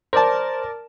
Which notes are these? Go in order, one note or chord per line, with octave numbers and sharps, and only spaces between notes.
A#4 C5 D5 A5